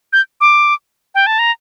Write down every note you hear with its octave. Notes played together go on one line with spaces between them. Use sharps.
G6
D6
G5
A5
A#5